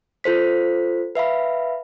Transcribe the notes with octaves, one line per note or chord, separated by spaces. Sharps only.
F4 A4 C5 B6
B4 E5 F5 B5